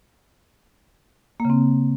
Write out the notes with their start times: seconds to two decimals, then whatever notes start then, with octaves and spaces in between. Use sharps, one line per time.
1.40 A#3
1.45 C#3
1.50 C4